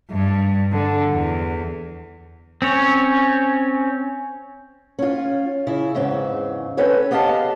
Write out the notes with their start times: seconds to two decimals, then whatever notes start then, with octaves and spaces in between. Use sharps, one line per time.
0.11 G2
0.73 D3
1.14 E2
2.62 C4 C#4 C#5
4.99 C#4 F4
5.67 C#3 E4
5.94 E2 G#2 C#3 C4
6.77 C4 C#4 A4 B4 C#5
7.11 B3 G4 D#5 F5 A5